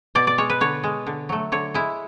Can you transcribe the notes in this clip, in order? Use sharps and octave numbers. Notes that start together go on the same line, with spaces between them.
B2 D5
D5
G#3 C#5
B4
D3 C#5
G#3
D3
F#3 A3
D3 C#5
G#3 E4